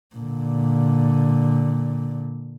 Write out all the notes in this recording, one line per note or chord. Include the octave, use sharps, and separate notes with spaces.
A#2 D3